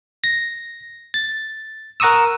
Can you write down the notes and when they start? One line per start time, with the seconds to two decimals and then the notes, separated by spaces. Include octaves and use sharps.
0.24 A#6
1.14 A6
2.00 A#4 F#5 A#5 C#6 D#6 E6